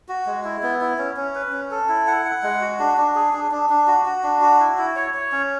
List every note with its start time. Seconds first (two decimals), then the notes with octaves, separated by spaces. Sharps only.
0.09 F#4
0.26 G#3
0.44 E4
0.63 B3
0.81 E4
0.98 C#4
1.17 C#4
1.35 B4
1.53 C#4
1.71 A4
1.89 E4
2.07 F#5
2.25 F#5
2.43 G#3
2.61 F#4
2.79 D4
2.98 D4
3.15 G#4
3.33 D4
3.51 D4
3.70 D4
3.87 F#4
4.05 F#4
4.23 D4
4.41 F#4
4.60 E4
4.78 E4
4.96 C#5
5.14 C#5
5.32 C#4